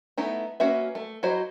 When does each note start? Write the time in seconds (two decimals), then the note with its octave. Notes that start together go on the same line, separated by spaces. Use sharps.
0.18 A3 B3 D#4 E4
0.60 A#3 C#4 F#4 B4 E5
0.95 A3
1.23 F#3 E4 F#4 C5 D#5